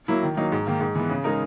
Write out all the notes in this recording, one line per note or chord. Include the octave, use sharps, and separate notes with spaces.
F#3 A#3 E4
D#3
F#3 A#3 D#4
G#2
D#3 A#3
G#2
E3 B3
C#3
G#3 D#4 A#4